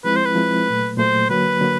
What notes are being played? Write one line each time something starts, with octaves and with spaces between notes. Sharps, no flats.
F3 G#3 C4 E4 B4
C5
B4
F3 G#3 C4 E4
A#2 F#3 A3
A#2 F#3 A3 C5
D3 F#3 A#3 B4
D3 F#3 A#3